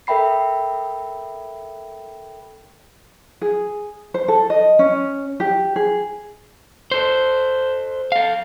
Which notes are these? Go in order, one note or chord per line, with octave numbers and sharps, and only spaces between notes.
A4 A#4 E5 G5 B5 C7
G#4
C5
A4
D#5
C#4
G4
G#4
A4 C5
A4 F5